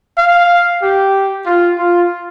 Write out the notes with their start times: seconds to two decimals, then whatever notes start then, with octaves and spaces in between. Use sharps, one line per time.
0.17 F5
0.82 G4
1.46 F4
1.79 F4